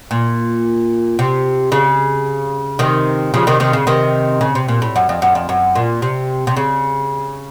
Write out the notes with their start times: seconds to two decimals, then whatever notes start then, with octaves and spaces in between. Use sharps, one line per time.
0.11 A#2
1.19 C3
1.72 C#3
2.79 C3 D#3
3.34 C#3 F3
3.47 C3 D#3
3.60 C3 D#3
3.73 C#3
3.87 C3 D#3
4.41 C#3
4.55 C3
4.68 A#2
4.82 A2
4.96 F#2
5.09 F2
5.22 F#2
5.35 F2
5.49 F#2
5.75 A#2
6.02 C3
6.47 C3
6.57 C#3